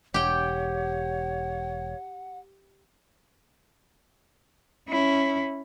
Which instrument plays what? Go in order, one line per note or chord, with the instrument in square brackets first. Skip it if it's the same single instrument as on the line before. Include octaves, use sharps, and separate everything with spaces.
[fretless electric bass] E1 [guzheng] G4 G5 [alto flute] C#5 [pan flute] F#5
[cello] C#4 E4